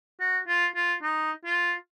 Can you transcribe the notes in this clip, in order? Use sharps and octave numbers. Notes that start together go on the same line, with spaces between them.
F#4
F4
F4
D#4
F4